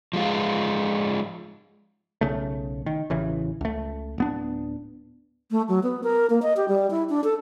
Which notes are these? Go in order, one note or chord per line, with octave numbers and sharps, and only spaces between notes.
F3 G#3 F4
B1 C#3 A3
D#3
A1 C#3 E3
C#2 A3
D1 B3 D4
A3
F#3
B3
A#4
A#3
D#5
G4
G3
E4
D4
A4